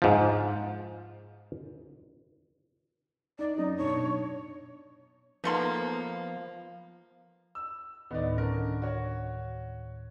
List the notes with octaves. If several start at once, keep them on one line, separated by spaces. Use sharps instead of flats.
G#2 F3
D#4 D5
F#2 F#3 D#4 D5
B2 D4 D#4 C#5
F3 A#3 B3 D#4 A4 C6
E6
D2 A2 D#3 B3 D#4 D5
D3 C#4 A#4
F#4 C#5